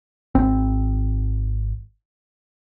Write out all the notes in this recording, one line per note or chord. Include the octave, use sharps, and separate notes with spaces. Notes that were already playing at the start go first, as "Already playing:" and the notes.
G#1 C4